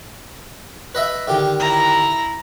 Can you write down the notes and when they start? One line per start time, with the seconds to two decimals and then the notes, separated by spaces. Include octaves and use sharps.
0.95 B4 D#5 E5
1.28 D3 D#3 G4
1.60 E4 A#5